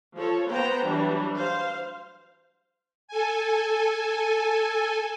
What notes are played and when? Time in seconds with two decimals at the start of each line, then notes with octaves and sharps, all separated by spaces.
0.15 F3 A4 C#5
0.49 B3 C5 G5 A#5
0.85 E3 F#3 G3 D4
1.36 C5 F5
3.08 A4 G#5